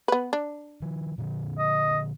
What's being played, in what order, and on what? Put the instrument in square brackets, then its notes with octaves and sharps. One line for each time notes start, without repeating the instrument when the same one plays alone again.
[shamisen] B3 B4
D4
[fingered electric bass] D#3 F3
A#2 D3 F3
[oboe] D#5